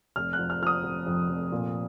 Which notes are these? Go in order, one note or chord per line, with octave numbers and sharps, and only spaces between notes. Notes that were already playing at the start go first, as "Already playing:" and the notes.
F1 F6
F#6
F3
F6
F3 D#6 F6
F1
F2
F1
A#2